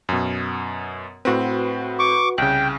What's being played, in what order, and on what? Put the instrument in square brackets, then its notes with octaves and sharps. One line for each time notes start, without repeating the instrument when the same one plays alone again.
[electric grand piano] F#2 B2
[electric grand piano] A2 C4 [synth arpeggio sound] F#4 B4
[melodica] C#6 D6
[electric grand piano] C2 C#3 [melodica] G5 [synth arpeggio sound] F#6